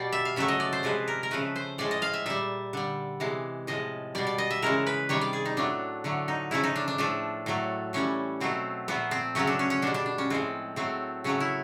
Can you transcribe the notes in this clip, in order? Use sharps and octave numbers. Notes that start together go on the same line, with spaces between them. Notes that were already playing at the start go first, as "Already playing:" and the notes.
Already playing: B2 G3 D5
E5
F5
C#3 F#3 A3 E5
D#5
D5
C5
C3 F3 G#3 B4
A#4
A#4
C#3 F3 A3 B4
C5
A2 F3 G#3 D5
D#5
F5
E5
A#2 G3 E5
D3 G3
C3 E3 G#3
A2 F3 G#3 D#5
B2 G3 D5
D5
D#5
E5
C#3 E3 G#3 A#4
B4
C3 D#3 G3 C#5
D5
G#4
D#4
A2 F#3 A3 D4
D3 F#3 A3
D#4
C#3 F3 A3 E4
D#4
D4
D4
A2 F3 A3 D4
A2 F#3 A3
A2 E3 G3 C#4
B2 F#3 A3 C4
A#2 F3 A3 B3
C4
C#3 F#3 A3 C#4
D4
C#4
C#4
B2 G3 D4
D4
D4
C#4
A2 F3 G#3 C4
A2 F#3 A3 C4
C#3 F#3 A3 C#4
E4